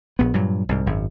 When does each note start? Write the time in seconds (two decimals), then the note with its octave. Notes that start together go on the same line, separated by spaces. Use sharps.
0.19 A#1 B3
0.34 G2 A#2 F#3
0.69 C2 G#2
0.86 G#1 F#2